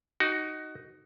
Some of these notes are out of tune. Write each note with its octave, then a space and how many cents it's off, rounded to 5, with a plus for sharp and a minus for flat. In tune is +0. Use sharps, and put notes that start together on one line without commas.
D#4 +0 F#4 +20